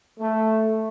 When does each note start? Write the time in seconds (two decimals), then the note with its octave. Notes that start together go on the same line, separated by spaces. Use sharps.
0.19 A3